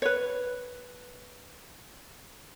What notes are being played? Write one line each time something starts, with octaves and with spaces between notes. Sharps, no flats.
B4 C#5